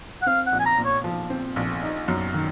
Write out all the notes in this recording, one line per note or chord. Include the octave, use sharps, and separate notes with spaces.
F#5
C4 F5
F#5
A#1
G#5
A#5
A#2
C#5
F3
C4
A#1
D#4
F#2
D#3